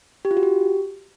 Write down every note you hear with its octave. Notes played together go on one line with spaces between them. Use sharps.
G4
F4
F#4
G4